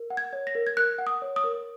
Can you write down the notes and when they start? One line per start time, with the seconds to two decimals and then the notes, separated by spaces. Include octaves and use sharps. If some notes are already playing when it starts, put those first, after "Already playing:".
Already playing: A#4
0.10 F#5
0.17 G#6
0.33 C#5
0.47 A#6
0.55 A#4
0.67 G#6
0.77 A#4 F#6
0.98 F#5
1.07 D#6
1.22 C#5
1.36 D#6
1.44 A#4